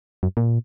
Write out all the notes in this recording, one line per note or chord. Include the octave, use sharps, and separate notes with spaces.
F#2
A#2